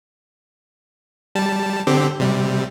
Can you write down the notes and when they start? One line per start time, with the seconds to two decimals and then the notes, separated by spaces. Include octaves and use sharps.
1.35 G3 A5
1.87 D3 C4 G4
2.20 C3 G3